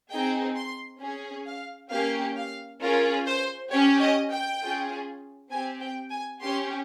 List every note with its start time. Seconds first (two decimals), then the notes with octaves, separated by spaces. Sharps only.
0.11 C4 D#4 G#4 G5
0.56 C6
1.01 C#4 G#4
1.46 F5
1.91 A#3 C#4 G4 F5
2.36 F5
2.81 C#4 F4 G#4 A#4
3.27 C5
3.71 C#4 G4 C#5
4.01 D#5
4.32 G5
4.61 C#4 F4 G#4
5.51 C4 G4 G#5
5.81 G5
6.11 G#5
6.41 C#4 G4 C6